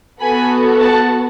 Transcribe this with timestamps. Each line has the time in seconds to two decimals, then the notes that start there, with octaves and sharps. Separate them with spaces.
0.20 B3 F#4 A4 G#5 B5
0.80 F#5 A5